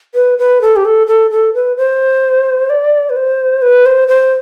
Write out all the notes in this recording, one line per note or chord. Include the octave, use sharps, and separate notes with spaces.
B4
B4
A4
G4
A4
A4
A4
B4
C5
D5
B4
C5
B4
C5
C5